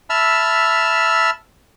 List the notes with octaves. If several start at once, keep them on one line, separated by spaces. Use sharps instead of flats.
E5 A5 B5 E6 F6